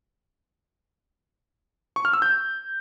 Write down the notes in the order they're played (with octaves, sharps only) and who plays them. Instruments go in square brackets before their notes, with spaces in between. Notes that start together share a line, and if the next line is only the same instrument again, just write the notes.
[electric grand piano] C#6
F6
E6
G6